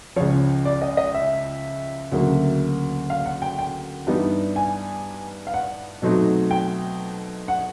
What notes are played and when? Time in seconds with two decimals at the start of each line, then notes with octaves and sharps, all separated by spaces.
0.16 C#2 C#3 F3 C#5
0.65 D5
0.82 D#5
0.97 D#5
1.14 E5
2.12 D2 C#3 F#3 A#3
3.10 F5
3.26 F#5
3.42 G5
3.59 G5
4.07 G2 E3 G3 B3 D#4
4.56 G#5
5.47 F5
5.54 F#5
6.02 B2 F#3 A3 C4 D#4
6.51 G5
7.48 F#5